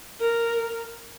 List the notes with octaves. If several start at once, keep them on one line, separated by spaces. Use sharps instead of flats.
A#4